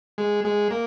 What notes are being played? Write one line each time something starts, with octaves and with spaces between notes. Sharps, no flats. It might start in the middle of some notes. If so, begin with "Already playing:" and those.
G#3
G#3
A#3